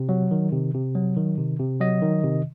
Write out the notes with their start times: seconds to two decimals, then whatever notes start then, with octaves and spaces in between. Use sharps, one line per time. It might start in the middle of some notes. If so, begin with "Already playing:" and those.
Already playing: C3
0.09 F#3
0.31 D#3
0.52 C3
0.74 C3
0.95 F#3
1.16 D#3
1.38 C3
1.59 C3
1.80 F#3 D#5
2.02 D#3
2.24 C3